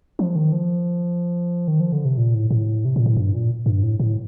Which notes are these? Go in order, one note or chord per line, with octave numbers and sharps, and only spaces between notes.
F3
D#3
F3
D#3
F3
D3
C3
A#2
A2
A2
C3
A#2
A2
G2
A#2
G2
A2
A2